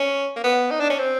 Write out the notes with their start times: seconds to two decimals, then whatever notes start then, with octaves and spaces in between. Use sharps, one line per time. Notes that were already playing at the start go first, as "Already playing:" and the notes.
Already playing: C#4
0.36 A#3
0.44 B3
0.71 D#4
0.80 D4
0.90 C#4
0.98 C4